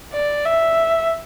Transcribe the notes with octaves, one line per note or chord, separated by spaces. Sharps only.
D5
E5